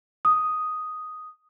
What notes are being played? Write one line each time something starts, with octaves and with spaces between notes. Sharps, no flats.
D#6